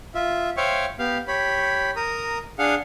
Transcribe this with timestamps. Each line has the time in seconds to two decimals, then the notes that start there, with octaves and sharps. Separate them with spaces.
0.15 F4 E5
0.57 C5 C#5 E5 F5 G5 C#6
0.99 B3 G4 F5
1.28 G4 C#5 B5
1.96 A#4 A#5 D#6
2.59 D4 G#4 F5 F#5